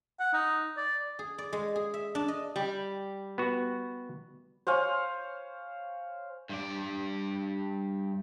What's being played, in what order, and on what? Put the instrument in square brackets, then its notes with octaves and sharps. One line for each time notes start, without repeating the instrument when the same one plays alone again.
[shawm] F#5
D#4
D5
[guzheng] G#4
D5
G#3
G#4
E5
D4
D#5
[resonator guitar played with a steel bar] G3
[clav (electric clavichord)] B3 F#4
[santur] C5 C#5 F5 G#5
[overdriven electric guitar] G2 D5